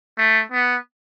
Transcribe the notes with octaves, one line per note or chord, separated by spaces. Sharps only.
A3
B3